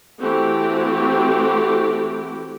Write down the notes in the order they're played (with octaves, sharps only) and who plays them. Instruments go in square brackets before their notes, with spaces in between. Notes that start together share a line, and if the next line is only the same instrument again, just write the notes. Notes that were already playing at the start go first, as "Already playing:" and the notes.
[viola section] E3 A3 C4 F#4 G4